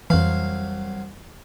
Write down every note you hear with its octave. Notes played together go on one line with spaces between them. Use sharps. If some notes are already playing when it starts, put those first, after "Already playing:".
C2 F2 E3 F#3 F5